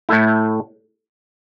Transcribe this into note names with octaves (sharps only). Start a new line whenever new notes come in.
A2 A3 E4